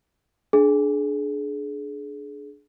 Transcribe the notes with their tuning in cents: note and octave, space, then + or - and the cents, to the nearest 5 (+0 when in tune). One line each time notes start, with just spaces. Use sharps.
D4 +0 G#4 +25